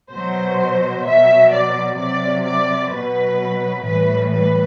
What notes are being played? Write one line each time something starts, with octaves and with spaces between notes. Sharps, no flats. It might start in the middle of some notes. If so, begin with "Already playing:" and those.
B2 F#3 C5
B2 F#3 E5
D5
C3 F#3 D5
D5
B2 F#3 B4
A2 E3 G3 B4
B4